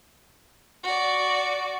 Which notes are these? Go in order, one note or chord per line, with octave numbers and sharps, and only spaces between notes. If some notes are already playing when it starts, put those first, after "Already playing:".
F#4 D5